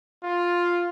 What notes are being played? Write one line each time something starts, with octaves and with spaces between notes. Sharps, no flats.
F4